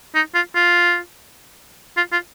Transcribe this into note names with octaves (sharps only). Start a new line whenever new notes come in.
D#4
F4
F4
F4
F4